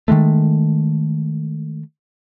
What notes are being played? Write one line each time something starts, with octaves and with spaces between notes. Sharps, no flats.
D#3 F3 G#3 A3